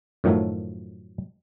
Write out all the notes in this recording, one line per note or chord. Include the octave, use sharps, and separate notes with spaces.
F#2 A2 D#3 F3 F#3 A3